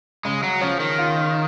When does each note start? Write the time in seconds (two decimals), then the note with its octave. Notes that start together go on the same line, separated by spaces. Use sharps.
0.25 C#3 G#3
0.43 F#3
0.61 F3 C#4
0.80 D#3
0.98 F4